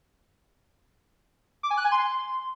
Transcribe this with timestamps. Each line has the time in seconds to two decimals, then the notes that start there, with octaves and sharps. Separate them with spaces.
1.63 D6
1.70 G#5
1.77 F#6
1.84 G#5
1.92 C6